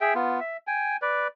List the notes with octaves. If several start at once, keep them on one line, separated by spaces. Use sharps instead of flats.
G#4 E5 G5
B3 F4
E5
G5 G#5
B4 D5